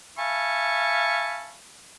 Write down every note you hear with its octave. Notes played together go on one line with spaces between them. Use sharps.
E5 F5 G#5 A5 B5 C#6